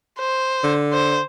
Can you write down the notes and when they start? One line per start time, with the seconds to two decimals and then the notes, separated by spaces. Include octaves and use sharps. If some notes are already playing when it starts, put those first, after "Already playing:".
0.19 C5
0.64 D3
0.93 C5